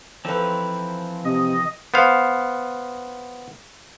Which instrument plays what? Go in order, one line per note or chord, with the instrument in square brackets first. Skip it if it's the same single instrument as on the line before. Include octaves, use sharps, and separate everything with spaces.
[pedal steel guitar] E3 F3 C4 [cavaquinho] D#4 A4 B4
[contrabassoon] C3 [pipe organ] D#5
[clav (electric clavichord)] B3 C5 F5